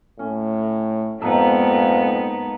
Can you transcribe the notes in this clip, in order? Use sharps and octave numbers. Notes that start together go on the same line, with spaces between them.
A2 C#4
F2 G#2 A#3 B3 D#4 A4